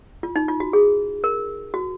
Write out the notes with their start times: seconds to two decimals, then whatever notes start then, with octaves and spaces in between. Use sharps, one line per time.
0.23 F4
0.36 D#4
0.48 F4
0.60 F#4
0.73 G#4
1.24 A#4
1.74 F#4